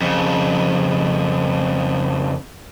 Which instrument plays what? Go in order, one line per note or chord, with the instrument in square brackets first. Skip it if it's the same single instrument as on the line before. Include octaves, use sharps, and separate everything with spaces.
[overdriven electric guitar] F2 C#3